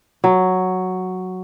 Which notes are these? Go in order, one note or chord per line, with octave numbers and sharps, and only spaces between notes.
F#3